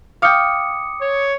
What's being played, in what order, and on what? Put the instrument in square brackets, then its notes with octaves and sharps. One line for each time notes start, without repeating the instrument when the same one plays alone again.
[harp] F5 G5 [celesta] D6 D#6 C#7
[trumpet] C#5